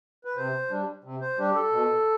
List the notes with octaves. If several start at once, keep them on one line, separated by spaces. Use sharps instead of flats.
B4
C3 C5
G3 D4
C3
C5
G3 D4 G4
A4
B2